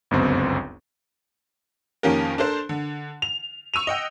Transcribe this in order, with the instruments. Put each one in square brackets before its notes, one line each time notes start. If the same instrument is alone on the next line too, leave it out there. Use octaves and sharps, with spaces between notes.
[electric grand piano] G1 C#2 F#2 B3 C4
[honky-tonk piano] F2 D#3 A#3 C#4 G4 A#4
D4 A4 A#4 C5
D3
F7
C#6 E6 D#7 F7
D#5 F#5 G5